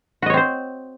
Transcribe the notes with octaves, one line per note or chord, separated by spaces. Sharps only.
C4 F#4 C5 C#5 D#5